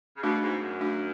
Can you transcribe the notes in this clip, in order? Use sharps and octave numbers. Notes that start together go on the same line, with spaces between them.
C#3
B2 A3 D4 F#4
G#2
F#2
A3 D4 F#4